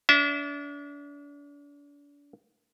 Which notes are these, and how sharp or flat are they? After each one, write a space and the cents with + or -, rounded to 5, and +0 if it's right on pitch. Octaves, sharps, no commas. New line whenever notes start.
D4 -40 E5 -20